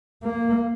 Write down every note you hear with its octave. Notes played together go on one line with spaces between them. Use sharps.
A#3